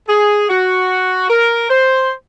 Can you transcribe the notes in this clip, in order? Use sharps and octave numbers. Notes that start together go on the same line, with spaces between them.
G#4
F#4
A#4
C5